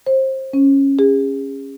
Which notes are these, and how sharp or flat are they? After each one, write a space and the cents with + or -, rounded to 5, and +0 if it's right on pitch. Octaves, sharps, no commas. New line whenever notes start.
C5 +25
C#4 -10
G#4 -35